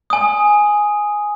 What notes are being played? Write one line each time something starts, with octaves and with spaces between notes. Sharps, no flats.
G#5 D#6